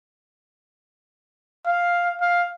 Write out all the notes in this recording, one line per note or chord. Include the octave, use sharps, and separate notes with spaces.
F5
F5